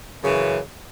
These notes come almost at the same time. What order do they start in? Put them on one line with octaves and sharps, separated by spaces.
F#2 C#3 E3